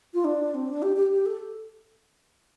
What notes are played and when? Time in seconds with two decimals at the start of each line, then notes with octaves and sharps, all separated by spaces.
0.14 F4
0.25 D4
0.54 C4
0.68 D4
0.82 G4
0.97 G4
1.11 G4
1.26 A4